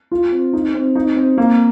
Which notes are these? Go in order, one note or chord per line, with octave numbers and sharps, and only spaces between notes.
F4
C4
D#4
C4
D#4
C4
A#3